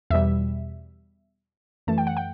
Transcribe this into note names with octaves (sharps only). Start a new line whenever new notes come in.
E2 B2 G3 E5
F#2 E3 A3 A5
G5
F#5
G5